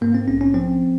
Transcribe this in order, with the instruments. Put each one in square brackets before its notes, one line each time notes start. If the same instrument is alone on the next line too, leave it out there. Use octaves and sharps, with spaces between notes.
[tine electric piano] G#2 A#3
C4
A#1 C#4
C#4
F3 C4